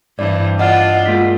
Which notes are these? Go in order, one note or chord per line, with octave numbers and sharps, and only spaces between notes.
G2 E3 C4 D5
D4 F4 D5 D#5 F#5 F6
G#3 A#3 F4 B6